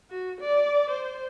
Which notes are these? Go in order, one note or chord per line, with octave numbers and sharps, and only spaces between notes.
F#4
D5
C5